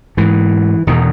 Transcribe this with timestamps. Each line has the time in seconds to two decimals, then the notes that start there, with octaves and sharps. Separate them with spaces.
0.17 G#2 E3
0.87 E2 B2 D#3